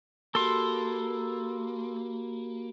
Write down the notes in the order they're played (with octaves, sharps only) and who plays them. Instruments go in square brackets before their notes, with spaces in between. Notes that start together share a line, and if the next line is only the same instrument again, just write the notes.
[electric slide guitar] A#3 [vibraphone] F#4 G4 B5 [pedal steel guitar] A4 C6